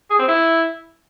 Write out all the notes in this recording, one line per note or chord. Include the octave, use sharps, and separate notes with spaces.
G#4
C4
E4